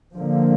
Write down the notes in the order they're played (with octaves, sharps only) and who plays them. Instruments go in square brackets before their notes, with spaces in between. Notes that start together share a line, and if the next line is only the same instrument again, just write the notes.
[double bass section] D3 F3 A#3